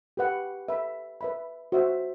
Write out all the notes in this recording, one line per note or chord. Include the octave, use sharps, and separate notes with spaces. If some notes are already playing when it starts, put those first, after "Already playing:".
G4 B4 F#5
B4 E5 B5
B4 E5 B5
F#4 C5 E5